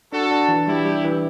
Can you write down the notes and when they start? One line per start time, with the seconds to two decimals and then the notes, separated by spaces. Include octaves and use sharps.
0.12 D4 F#4 A4
0.31 D4
0.49 E3
0.67 G3 E4 G4
0.85 G3
1.04 E3